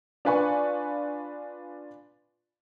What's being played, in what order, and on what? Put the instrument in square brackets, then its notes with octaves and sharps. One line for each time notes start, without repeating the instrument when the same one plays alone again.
[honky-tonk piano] D4 F4 B4 G#5 B5 C#6